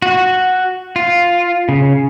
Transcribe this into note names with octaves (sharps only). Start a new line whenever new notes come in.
F#4
F4
C#3